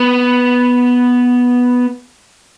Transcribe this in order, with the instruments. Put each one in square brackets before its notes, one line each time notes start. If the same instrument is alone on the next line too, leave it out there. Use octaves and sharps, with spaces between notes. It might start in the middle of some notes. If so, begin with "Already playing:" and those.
Already playing: [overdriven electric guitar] B3